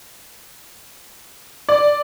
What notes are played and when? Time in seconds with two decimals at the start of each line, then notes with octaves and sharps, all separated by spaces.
1.69 D5